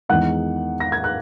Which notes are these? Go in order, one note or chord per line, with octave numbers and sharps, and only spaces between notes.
E2 D#3 G#3 D#4 F#5 F#6
A#6
G#6
F#6